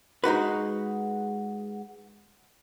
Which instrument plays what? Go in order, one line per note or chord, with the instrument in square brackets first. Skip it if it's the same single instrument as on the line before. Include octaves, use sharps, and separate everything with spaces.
[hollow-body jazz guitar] G#3 D#4 F#4 B4